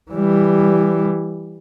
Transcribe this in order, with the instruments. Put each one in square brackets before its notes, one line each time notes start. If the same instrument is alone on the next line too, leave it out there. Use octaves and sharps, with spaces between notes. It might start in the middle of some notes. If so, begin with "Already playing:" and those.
[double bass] E3 G3